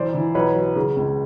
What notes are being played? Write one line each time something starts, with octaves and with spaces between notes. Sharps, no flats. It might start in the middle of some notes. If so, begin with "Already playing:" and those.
Already playing: B1 E3 C5 D5
E3
B1 B4 C#5
F#3
C#3
C#2